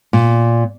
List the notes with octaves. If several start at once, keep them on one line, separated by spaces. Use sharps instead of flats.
A#2